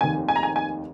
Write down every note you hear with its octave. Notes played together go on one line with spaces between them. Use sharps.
F1 D#2 D#3 G#5
G#5
A#5
G#5
G#5